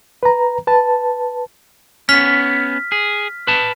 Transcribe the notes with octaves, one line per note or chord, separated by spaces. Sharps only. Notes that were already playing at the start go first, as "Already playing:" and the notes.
B4 A#5
B4 A5
B3 C#4 F6 B6
G#4
B4 A5